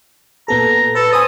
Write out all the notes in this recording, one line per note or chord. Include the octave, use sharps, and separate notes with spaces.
A#2 B3 A4 A#5
A4 B4
C5 G#5 D#6